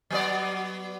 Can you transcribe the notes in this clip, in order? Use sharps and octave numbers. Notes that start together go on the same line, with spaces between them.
F#3 B3 D5